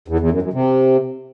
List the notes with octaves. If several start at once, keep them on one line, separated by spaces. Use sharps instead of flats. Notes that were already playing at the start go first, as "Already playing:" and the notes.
E2
E2
F#2
F#2
C3